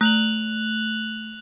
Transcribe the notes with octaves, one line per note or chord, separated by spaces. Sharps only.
A3 F#6 F7 F#7